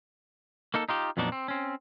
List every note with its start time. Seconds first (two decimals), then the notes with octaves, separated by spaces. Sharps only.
0.74 A#3 D#4 A4
0.89 D#4 F4 G4
1.17 F2 A#2 F#3 B3 D4 D#4
1.32 C4
1.48 C4 C#4